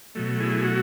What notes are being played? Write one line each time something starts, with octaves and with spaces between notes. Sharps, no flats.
B2 F#3 A3
E4 G#4
F#4